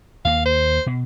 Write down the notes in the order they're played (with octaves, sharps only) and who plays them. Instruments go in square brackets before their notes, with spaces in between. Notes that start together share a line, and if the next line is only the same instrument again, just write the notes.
[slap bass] D#2 A#3 [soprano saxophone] F5
[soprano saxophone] C5
[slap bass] B2